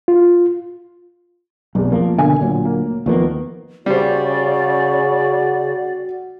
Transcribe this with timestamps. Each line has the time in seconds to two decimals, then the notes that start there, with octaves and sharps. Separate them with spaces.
0.08 F4
1.75 F1 B1 E2
1.92 F3 A#3
2.18 B2 D3 A#4 G#5
2.41 D2 A#2 F#3
2.65 A#3
3.06 D#2 D#3 F3 A#3 B3
3.86 C#3 G3 F#4 C5 D5